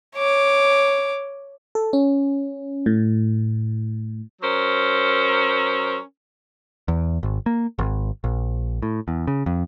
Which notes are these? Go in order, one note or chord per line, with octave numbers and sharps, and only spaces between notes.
C#5 D6
A4
C#4
A2
F#3 C#4 A#4 C5
E2
G#1
A#3
G#1
A#1
A2
E2
C#3
F2